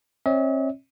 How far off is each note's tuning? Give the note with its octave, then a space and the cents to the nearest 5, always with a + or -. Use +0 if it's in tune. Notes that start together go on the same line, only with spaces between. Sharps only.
C4 +45 C#5 +40 E5 -45